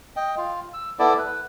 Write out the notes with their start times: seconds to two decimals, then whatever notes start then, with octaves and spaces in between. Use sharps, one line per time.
0.16 D#5 G5
0.37 F4
0.74 E6
0.99 B3 E4 A4 D5
1.19 B4